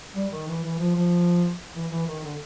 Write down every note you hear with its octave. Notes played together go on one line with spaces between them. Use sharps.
G3
D#3
E3
E3
F3
F3
E3
E3
D#3
D3